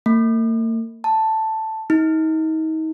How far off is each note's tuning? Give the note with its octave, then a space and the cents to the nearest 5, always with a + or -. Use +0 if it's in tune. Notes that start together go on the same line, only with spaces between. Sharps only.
A#3 -45
A5 +5
D#4 +35